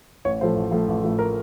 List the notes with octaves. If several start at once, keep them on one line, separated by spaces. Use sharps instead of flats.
A1 C#5
A2 F3 A3 C5
A1
A2 F3 A3
A1
A2 F3 A3
A#4